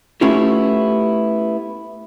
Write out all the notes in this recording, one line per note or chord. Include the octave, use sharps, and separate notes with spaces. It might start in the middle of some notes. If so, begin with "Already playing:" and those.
A3 B3 C#4 E4 F4 G4